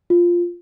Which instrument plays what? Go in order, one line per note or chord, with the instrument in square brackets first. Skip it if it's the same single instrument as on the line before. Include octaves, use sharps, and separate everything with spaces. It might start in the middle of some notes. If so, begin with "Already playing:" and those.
[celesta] F4